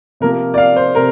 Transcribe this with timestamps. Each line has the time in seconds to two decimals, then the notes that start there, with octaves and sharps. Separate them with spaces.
0.20 C3 F3 A#3 A#4
0.54 D5
0.58 F5
0.76 C5
0.95 C3 A#4